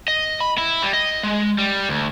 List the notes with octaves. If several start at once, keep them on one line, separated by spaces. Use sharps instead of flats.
D#5
B5
E4
G3
D#5
G#3
G3
D2